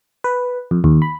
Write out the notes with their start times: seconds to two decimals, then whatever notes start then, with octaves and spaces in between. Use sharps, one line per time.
0.24 B4
0.71 F2
0.84 D#2
1.02 B5